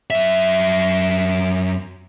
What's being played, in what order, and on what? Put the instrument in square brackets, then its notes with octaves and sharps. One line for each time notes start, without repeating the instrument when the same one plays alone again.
[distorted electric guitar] F#2 E5